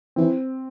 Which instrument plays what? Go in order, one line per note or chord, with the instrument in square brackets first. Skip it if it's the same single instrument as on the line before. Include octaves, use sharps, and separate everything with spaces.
[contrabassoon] E3 [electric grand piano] C4